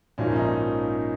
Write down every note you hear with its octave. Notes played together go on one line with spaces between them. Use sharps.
A#1 G#2 F3 A#3 C#4
D#4